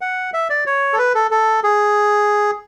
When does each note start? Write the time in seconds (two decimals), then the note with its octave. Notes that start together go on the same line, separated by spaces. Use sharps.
0.01 F#5
0.33 E5
0.50 D5
0.66 C#5
0.93 A4
0.98 B4
1.15 A4
1.31 A4
1.64 G#4